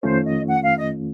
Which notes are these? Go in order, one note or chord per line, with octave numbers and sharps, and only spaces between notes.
F2 D#3 A3 C#4 F4 C5
D#5
F#5
F5
D#5